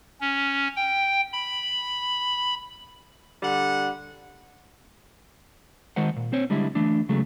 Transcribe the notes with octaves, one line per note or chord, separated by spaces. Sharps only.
C#4
G5
B5
D3 G3 F#5
D#3 G#3 C5 F#5
A#2
C4 C5 C#5
D3 G3 G#3 E4
E3 A3 D4
C#2 C#3 F#3 G#3 A3